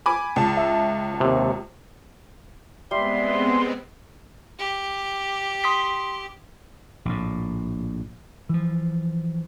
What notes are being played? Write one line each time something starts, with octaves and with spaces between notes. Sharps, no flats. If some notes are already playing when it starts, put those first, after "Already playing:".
G#5 B5 D6
C#2 A5
E5
D#2 C3
G3 G#3 B3 C4 E5 C6
G4
C6 D#6 B6
A#1 A2
E3 F3